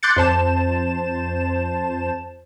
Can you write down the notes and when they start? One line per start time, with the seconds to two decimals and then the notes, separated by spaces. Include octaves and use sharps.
0.03 C6 D6 F#6 G6 A6 C#7
0.16 F2 C5 A5 E7